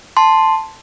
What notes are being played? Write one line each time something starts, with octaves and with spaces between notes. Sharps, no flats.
A5 C6